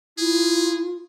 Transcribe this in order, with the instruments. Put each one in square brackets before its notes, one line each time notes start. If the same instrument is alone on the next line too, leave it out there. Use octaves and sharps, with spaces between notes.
[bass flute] E4 [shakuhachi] F4 [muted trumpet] G#4